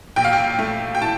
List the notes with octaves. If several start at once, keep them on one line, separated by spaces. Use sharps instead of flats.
A#1 G5
F5
G5
A3
G5
A2 A5